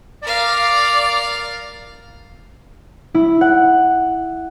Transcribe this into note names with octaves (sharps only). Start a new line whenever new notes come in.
A#4 D5 F5
E4
F#5